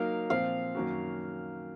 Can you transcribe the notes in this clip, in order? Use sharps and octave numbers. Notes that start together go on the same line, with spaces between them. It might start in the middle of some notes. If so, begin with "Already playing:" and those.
Already playing: F#3 A#3 D#4 A#4 F5
A#2 F3 C4 F5
F#2 D#3 A#3 C#4 F#4